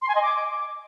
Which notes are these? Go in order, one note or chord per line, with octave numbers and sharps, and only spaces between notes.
C6
G#5
D#5
D6